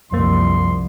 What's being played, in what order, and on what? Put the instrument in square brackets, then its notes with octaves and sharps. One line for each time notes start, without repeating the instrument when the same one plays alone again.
[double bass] C2 F3 [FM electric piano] F#2 A#3 [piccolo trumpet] C6